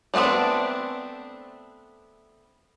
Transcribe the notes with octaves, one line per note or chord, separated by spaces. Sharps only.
G3 A3 B3 C4 D4